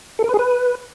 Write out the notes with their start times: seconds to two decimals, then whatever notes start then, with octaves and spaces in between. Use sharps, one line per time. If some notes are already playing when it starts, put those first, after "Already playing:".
0.19 A4
0.24 A#4
0.29 B4
0.34 G#4
0.39 B4